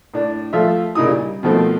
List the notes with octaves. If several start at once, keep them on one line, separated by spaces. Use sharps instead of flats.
A2 D4
F3 A3 F4 E5
A#2 C#3 D#4 E4 D#6
G3
B2 D#3 F3 A3 C4